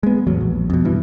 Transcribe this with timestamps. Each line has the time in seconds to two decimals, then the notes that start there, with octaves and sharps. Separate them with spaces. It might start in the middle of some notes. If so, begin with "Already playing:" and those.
0.03 G#3 B3
0.27 A1 E2 F#3
0.41 A#1
0.70 F2 B2
0.85 G2 B2 E3